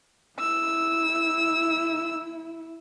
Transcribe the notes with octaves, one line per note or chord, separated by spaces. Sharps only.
E4 E6